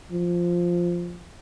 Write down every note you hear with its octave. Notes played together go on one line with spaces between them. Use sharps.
F3